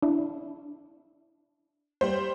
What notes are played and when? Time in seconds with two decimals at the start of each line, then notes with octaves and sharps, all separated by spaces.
0.02 D4 E4
2.01 G3 C5